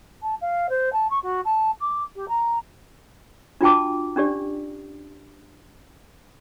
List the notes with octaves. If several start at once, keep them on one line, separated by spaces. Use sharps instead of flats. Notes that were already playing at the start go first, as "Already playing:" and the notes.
A5
F5
C5
A5
C#6
F#4
A5
D6
G4
A#5
D4 F4 F#4 G5 A5 D6
C#4 D4 G4 D5